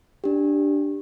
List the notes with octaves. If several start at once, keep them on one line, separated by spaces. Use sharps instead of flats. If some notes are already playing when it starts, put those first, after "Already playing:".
D4 G4